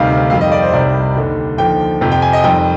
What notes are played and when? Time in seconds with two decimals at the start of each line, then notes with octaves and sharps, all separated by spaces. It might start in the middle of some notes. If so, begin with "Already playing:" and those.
Already playing: D2 C3 D#3 G3 F5
0.30 F2 D#3 G3 F5
0.41 D#5
0.52 D5
0.62 C5
0.73 C2 C3 D#3 G3 D5
1.16 D#2 D3 G3
1.58 D#2 D3 F3 G5
2.01 F2 C3 F3
2.12 G5
2.22 G#5
2.33 D#5
2.44 F2 D#3 G3 G5